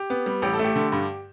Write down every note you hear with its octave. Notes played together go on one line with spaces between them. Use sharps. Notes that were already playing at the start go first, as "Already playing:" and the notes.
Already playing: G4
B3
G3
A1 G4
A4
A3 G4
D3
G2